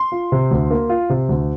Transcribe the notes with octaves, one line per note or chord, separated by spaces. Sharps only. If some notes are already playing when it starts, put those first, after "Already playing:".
Already playing: C6
F4
C3
D2
A#3
F4
C3
D2